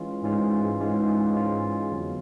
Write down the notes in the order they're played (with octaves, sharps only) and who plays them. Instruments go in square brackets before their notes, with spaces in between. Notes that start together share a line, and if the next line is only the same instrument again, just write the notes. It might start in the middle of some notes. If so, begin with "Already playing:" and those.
Already playing: [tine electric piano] E3 G#3 C#4 F4
[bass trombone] G#2 [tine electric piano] E3 G#3 C#4 F4
[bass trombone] G#2 [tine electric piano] E3 G#3 C#4 F4
[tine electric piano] E3 G#3 C#4 F4
F2 D3 F#3 B3